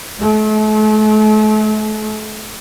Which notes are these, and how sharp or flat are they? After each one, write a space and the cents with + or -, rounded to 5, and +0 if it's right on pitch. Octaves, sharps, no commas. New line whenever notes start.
A3 -40